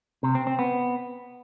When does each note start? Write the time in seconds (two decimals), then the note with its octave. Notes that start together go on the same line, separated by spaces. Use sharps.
0.23 C3
0.35 C4
0.47 C4
0.59 B3